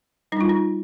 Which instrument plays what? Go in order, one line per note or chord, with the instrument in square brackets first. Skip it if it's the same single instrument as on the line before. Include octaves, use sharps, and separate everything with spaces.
[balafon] G3 D#4
D4 F4
D#4